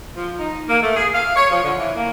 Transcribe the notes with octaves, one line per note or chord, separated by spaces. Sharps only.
F3
D#4
A#3
A3
G#4
F5
C#5
F3
D3
E3
A#3